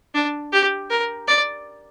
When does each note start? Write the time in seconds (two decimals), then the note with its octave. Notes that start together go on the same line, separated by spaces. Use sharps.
0.14 D4
0.52 G4
0.90 A#4
1.28 D5